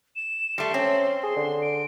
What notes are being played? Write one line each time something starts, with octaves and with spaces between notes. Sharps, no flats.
E7
G3 A3 C6
C4 C#4
G#4 C6
D3
D7